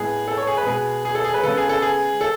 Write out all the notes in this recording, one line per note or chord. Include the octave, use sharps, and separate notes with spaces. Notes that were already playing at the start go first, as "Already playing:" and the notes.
Already playing: A2 G#3 B3 G#4
A4
C#5
G#4
B4
B2 G#3 B3 G#4
G#4
A4
G#4
B4
C#3 G#3 B3 A4
G#4
A4
G#4
A4